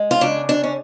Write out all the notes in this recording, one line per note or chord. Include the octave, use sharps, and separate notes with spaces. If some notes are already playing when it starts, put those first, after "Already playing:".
Already playing: G#3
F4
C#3 D4
D4
C#4